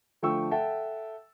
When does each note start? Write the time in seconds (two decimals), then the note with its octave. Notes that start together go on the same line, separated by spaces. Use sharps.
0.22 D3 F3 A3 G5 C#6 E6
0.51 A4 E5 F#5 G5 A5